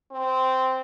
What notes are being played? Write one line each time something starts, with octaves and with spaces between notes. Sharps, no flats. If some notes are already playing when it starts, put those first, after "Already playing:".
C4